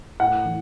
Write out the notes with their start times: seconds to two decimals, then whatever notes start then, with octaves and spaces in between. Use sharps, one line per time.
0.20 A2 F#5
0.45 E3